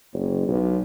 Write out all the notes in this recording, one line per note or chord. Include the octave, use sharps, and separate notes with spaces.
F#1
B1